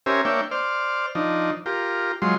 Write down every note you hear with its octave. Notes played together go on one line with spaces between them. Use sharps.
C#4 G4 A#4 C5 E5 G#5
A#3 D4 C#5 E5 G5
C5 D5 F6
F3 D4 D#4
F4 G4 A#4
F#3 G#3 F4 C6